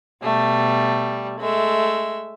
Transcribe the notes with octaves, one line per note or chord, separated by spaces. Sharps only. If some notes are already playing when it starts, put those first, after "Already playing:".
B2 G3 A3
G#3 A3 E5